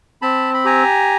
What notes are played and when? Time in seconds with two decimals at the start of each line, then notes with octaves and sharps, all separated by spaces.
0.22 C4 A5 B5
0.54 B5
0.65 G4 G#5 A#5